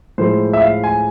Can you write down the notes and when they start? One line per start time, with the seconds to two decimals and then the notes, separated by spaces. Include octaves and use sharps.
0.18 A2 F3 G#3 C5
0.53 E5
0.62 F5
0.84 G#5